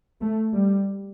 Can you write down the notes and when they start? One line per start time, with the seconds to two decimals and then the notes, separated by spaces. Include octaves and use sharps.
0.21 A3
0.53 G3